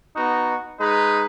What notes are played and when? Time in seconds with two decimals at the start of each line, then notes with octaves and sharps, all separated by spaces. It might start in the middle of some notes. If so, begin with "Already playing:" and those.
0.16 B3 D#4 F#4
0.79 G#3 D#4 B4